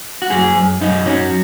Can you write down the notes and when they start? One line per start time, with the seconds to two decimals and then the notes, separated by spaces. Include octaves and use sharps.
0.22 F#4
0.30 F#2 G#4
0.56 F#2
0.81 F#2 D#4
1.06 F#3 C#4